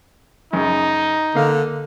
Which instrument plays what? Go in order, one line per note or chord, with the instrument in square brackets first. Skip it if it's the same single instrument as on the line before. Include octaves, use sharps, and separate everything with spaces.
[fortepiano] F#2 C#3 [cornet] D#4
[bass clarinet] D3 [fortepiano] A#3 F5